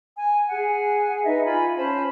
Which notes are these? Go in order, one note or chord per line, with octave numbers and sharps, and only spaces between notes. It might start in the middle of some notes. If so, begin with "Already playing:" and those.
G#5
G#4 F#5 G#5
D#4 B4 D#5 E5
F4 G#5 B5
C#4 C5 A5 B5